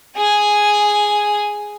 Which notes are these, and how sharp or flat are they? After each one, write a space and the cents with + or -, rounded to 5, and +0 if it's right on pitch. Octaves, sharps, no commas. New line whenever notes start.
G#4 +0 G#5 +0